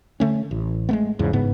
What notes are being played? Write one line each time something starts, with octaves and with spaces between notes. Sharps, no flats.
D3 A3 C#4
A1
G#3 A3 B3
E2 G#2 C#3
G1 G#2 C#3 B3